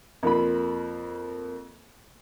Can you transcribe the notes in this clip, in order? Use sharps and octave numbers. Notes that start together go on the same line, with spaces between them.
F2 A#3 F4 B5